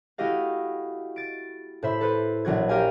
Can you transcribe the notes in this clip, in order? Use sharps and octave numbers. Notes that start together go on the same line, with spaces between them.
A3 E4 F#4 G4 D#5 F5
A6 D7
A2 C5 E5 B5
A4 B4 C5
A#1 F#3 F#4 G#6
G4 A#4 F5 G#5